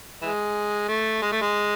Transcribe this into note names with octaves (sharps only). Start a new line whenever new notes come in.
E3 G#3
A3
G#3
A3
G#3